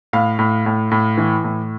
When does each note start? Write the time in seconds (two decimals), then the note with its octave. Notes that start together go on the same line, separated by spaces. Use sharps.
0.13 A2 F5
0.39 A2
0.66 A2
0.91 A2
1.18 E3
1.44 A2